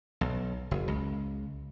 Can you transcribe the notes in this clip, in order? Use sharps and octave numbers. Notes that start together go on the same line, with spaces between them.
B1
F#1
C#2